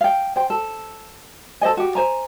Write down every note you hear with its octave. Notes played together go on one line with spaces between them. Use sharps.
F5 G5
C5 G5
A4
A4 C5 D#5 G#5
F#4 G4
C5 G#5 A#5